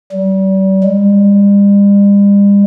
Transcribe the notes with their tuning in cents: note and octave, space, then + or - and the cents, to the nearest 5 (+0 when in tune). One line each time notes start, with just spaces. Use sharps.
G3 -35
G3 +45